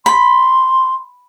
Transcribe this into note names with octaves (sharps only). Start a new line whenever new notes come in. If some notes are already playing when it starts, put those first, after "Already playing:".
B5 C6